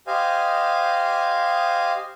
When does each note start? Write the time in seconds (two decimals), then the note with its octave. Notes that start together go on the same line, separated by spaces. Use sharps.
0.07 G4 C5 D#5 F5 G#5